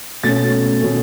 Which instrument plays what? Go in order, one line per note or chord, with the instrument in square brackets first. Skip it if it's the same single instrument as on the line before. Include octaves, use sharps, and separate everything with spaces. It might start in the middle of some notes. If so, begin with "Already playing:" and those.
[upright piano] B2 A3 C#4 A6
B2 A3 C#4